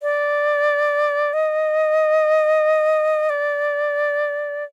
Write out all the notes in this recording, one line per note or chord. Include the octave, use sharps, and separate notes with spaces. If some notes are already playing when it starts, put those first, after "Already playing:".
D5
D#5
D5